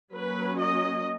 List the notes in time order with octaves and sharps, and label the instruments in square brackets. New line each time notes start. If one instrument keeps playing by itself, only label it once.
[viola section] F#3 A#3 C#4 B4
D#5